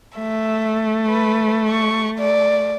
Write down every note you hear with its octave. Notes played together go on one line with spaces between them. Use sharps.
A3 E5
B4
C#6
D5